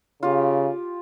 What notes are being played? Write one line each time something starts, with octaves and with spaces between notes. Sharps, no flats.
C#3 F4 G4